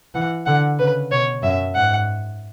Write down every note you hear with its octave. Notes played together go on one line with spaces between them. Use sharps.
E3 F#5
D3 F#5
C#3 B4
B2 C#5
F#2 E5
G#2 F#5